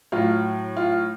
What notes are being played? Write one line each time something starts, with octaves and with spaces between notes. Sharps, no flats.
A2 F#3 F4
F4